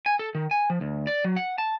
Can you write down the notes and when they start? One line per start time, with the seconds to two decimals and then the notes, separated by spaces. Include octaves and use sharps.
0.06 G#5
0.19 A4
0.35 D#3
0.51 G#5
0.70 F3
0.81 D2
1.07 D5
1.24 F#3
1.36 F#5
1.58 A5